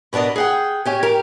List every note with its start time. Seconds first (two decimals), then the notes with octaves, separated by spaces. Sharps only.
0.13 B2 B3 D4 A#4 D#5
0.36 G#4 F#5 G5
0.85 C#4 G4 G#5
1.03 G4 A#4